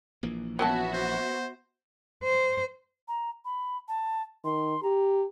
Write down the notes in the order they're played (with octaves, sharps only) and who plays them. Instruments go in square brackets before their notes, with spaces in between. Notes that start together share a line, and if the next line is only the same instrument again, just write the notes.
[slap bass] A#1 E3 A#3
[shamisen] F#3 C#4 A5 [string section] B3 F#4 E5
[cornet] C5
[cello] C5
[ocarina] A#5
B5
A5
[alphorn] D#3 [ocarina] C6
[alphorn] G4 [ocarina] A#5